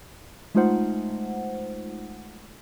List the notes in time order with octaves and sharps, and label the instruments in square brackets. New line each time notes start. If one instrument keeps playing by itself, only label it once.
[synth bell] G#3 A3 D#4 F4 C5 F#5